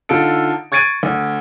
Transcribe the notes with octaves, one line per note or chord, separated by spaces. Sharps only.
D3 D#4 F4 A4 D7
C#6 G#6 A6 D7 D#7
D2